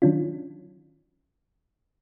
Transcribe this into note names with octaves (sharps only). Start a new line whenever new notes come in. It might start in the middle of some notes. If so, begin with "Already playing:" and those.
D#3 F#3 C#4 D4 F4